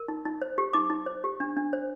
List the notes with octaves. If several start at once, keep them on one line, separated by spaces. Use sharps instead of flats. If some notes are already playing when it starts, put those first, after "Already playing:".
Already playing: A#4
D#4
D#4
C5
G4
D#4 D6
D#4
C5
G4
D4
D4
C5